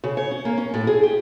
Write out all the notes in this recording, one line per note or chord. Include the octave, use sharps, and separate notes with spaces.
C#3
C#5
C#4
A#3
C#4
A2
G#4
G4